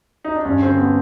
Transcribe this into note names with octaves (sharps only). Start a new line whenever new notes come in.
D#4
D4
G2 C#4
D3 C4
B3